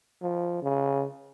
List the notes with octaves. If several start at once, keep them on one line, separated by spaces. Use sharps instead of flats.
F3
C#3